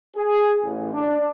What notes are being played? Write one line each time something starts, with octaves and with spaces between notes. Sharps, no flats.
G#4
A1
D4